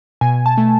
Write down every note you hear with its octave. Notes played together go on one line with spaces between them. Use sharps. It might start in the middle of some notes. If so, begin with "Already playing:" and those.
B2 G#5
A5
A3